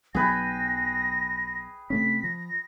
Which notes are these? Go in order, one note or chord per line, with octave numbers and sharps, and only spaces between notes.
B1 F#3 B3 G#4 B4 G5 A#6
C3 A3 C#4 B6
F3 A#6